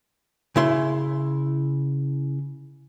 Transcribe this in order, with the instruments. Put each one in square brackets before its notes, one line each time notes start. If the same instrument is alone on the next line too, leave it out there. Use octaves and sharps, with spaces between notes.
[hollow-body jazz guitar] C#3 E4 C6